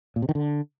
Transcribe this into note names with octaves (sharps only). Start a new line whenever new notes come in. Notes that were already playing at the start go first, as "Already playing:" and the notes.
A#2
C3
D#3
D3